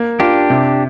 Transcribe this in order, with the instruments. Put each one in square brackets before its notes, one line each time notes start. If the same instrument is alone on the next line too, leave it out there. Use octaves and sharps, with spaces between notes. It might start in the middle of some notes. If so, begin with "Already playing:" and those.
Already playing: [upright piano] A#3
[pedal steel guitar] D4 G4 [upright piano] F4
[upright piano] C3